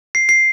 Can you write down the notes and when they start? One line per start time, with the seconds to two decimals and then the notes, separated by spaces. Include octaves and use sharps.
0.15 C7
0.29 C7